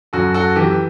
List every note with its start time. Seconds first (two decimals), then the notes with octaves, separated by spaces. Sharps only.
0.13 F#2 F#4 A4
0.34 F#4 A4
0.56 E3 G4